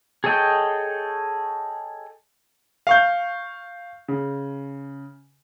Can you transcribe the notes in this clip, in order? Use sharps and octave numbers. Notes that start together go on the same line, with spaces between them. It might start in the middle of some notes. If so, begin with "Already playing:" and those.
G#4 A4 C#5 D#5 G5
F5 C#6 G6
C#3